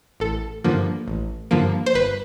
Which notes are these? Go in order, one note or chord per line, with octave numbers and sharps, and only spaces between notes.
A1 A4
G2 D3 F3 A#3
A1
G2 D3 F3 A#3
C5
G1 B4